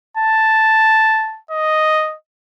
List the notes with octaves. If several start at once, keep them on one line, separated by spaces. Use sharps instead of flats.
A5
D#5